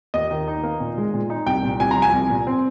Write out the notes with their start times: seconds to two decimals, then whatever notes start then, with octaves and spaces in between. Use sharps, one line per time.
0.14 D#2 D#5
0.31 D#3
0.48 D#4
0.63 A#3
0.80 A#2
0.98 G#3
1.14 A#2
1.30 D#4
1.46 C2 G5
1.63 A#2
1.80 C2 G#5
1.91 A#5
1.96 F3
2.02 G#5
2.13 C2
2.30 A#2
2.47 C4